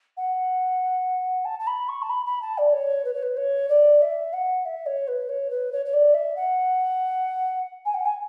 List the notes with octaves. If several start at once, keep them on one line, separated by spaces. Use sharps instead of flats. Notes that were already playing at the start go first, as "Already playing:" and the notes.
F#5
A5
A5
B5
C#6
A5
B5
B5
A5
D5
C#5
B4
C#5
B4
C#5
D5
E5
F#5
E5
C#5
B4
C#5
B4
C#5
C#5
D5
E5
F#5
G#5
F#5
G#5